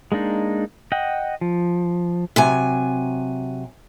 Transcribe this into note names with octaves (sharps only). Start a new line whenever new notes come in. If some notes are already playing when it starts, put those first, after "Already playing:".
G#3 A#3 D4 D#4
D#5 F#5 G5
F3
C3 F#3 G#5